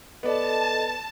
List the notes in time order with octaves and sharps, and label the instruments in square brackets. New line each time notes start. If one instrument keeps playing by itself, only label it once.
[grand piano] B3 D5 [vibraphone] A4 D#5 [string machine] A5